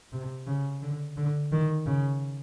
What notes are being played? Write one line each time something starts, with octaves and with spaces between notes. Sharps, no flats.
C3
C#3
D3
D3
D#3
C#3